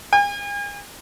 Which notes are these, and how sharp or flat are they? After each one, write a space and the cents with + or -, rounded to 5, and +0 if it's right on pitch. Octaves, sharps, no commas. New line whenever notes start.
G#5 -40